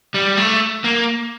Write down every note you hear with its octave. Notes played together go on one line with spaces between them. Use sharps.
G3
A3
A#3